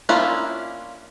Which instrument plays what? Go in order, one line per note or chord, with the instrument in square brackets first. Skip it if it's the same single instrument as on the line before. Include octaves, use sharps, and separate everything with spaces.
[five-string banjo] A#3 C#4 D4 E4 F4